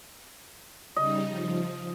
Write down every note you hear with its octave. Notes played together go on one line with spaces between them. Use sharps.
C#3 G3 D#4 D#5
F3